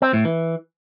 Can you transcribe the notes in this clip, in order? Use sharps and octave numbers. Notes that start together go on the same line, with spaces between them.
C4
A2
E3